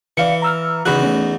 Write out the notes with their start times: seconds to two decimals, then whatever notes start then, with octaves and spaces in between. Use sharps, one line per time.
0.17 E3 D5 F5 C#7
0.42 A#5 E6 F6
0.85 E2 C#3 D#4 F#4 B5 F#6
1.03 A3 C#4